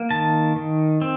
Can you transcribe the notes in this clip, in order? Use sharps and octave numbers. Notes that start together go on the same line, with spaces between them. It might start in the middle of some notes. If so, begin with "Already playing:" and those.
Already playing: A#3
D#3 A5
D#3
C4